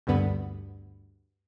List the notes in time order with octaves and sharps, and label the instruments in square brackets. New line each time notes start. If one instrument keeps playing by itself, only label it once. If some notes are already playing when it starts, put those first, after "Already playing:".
[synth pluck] D2 G2 D3 B3